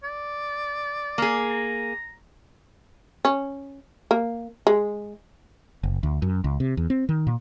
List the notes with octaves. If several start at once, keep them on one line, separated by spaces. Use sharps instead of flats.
D5
A#3 G#4
A#5
C#4
A#3
G#3
F#1
D2
F#2
C#2
C3
E2
C4
D#3
A#2